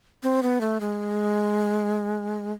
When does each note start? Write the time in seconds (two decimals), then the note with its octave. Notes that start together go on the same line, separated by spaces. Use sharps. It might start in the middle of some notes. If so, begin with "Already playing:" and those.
0.23 C4
0.43 B3
0.61 A3
0.80 G#3